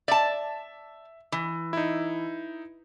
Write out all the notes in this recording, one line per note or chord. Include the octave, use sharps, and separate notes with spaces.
D5 E5 A5
E3
D#4 E4